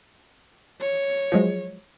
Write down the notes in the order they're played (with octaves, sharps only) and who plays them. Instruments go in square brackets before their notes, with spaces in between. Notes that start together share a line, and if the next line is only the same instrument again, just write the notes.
[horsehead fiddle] C#5
[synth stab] F3 F#3 G#3